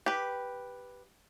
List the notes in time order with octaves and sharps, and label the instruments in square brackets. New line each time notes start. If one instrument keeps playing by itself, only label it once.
[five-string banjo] G4 B4